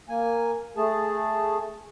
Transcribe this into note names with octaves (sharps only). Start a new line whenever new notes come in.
A#3 G#5
A3 G#4 A5